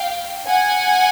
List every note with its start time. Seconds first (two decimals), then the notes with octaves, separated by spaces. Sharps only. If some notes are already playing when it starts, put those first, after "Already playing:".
Already playing: F5 G5
0.48 F#5 G#5